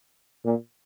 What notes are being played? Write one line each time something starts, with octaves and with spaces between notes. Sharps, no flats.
A#2